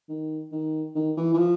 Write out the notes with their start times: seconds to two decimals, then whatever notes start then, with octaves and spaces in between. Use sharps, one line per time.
0.09 D#3
0.52 D#3
0.95 D#3
1.17 E3
1.34 E3
1.38 F3